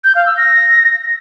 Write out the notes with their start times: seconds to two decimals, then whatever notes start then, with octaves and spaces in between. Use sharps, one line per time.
0.04 G6
0.15 F5
0.26 E6
0.37 A#6